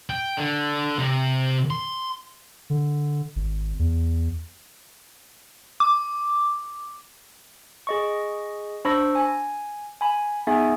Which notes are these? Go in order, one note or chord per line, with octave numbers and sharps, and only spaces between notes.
G5
D3
C3
C6
D3
G#1
E2
D6
G#4 D#5 C#6
D4 C5 B5 C#6 E6 A#6
G#5
G#5 B5
B3 D#4 G#4 E5 G#5